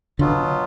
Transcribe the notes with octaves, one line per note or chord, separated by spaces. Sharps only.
B2 D3 F#3 B3 F4